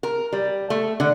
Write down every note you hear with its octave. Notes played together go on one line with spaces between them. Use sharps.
A#4
G3
A3
D3